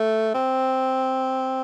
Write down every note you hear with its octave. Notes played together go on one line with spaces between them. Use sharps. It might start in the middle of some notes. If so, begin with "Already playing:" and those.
Already playing: A3
C4